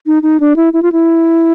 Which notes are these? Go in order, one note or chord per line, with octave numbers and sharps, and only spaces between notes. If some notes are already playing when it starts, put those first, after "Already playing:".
D#4
D#4
D4
E4
E4
F4
E4